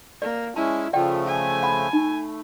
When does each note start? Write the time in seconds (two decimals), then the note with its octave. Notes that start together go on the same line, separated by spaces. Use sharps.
0.22 A#3 D5
0.56 G#3 C#4 E4 A5
0.93 C#3 F3 A3 F4 D5 F#5 G5
1.27 G#5
1.63 F#5 B5
1.93 A3 D#4